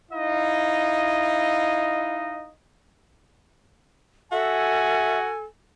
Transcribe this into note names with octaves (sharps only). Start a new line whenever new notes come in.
D#4 E4 D#5 F5
F#4 A4 E5 G#5